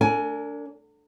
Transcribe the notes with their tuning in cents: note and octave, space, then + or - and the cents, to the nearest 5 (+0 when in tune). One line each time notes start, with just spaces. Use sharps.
D4 -20 A#4 -45 G#5 +15